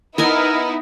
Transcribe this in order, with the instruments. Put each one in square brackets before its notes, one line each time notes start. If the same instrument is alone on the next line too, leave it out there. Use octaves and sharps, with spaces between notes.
[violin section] B3 D#4 E4 [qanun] A#4 D#5 G#5